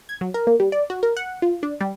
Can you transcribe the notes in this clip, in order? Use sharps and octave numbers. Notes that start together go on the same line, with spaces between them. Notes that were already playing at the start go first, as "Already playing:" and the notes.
G#6
F#3
A#4
A#3
G3
D5
F#4
A#4
F#5
F4
D4
G3